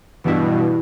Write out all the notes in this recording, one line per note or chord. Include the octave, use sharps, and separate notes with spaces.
G2 B2 E3 E4